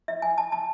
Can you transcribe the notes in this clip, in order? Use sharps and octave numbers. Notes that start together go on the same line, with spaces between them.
E5
G#5
A5
A5